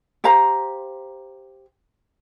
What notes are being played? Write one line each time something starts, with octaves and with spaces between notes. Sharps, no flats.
G4 C5 F5 A#5